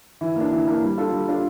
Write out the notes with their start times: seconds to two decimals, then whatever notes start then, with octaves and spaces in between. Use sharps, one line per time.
0.21 E3
0.36 A#3 D4
0.52 E3
0.67 A#3 D4
0.82 G3
0.98 D4 F4 A4
1.12 G3
1.28 D4 F4 A4